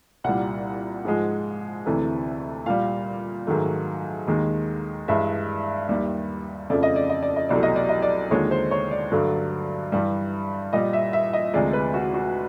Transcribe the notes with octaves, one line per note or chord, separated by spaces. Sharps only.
C2 A#2 G3 F#5
G#2 F3 G#3
D2 C3 E3 A3
A#2 G3 F5
G#2 D#3 F#3 A3
D#2 D#3 G#3
G2 E3 G#3 E5
D#2 D#3 G3
F2 C#3 F3 A3 D5
D#5
D5
D#5
D5
D#5
C2 B2 F#3 A3 D5
D#5
D5
D#5
D5
D#2 D3 F3 G#3 C#5
C5
C#5
D5
G2 D3 F#3 A3
G2 E3 G3
A#2 G3 D#5
E5
E5
D#5
D2 C3 F3 G#3 D5
B4
F#4
F#4